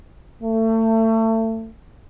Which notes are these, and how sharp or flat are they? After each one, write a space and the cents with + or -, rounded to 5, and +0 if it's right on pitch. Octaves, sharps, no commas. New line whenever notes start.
A3 +30